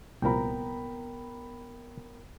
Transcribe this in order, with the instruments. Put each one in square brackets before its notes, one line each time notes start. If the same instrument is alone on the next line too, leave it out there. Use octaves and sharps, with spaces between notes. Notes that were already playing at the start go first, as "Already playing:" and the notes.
[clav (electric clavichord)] C2 A#2 F3 [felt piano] B3 A#5 B5 [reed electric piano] A#4 G5